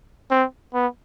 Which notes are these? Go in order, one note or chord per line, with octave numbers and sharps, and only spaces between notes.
C4
B3